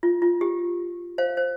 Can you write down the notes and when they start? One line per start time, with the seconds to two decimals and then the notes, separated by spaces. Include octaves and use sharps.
0.03 F4
0.22 F4
0.41 G4
1.18 C5 F5
1.37 C5